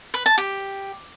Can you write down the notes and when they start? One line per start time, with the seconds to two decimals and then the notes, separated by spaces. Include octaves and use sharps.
0.14 B4
0.26 A5
0.38 G4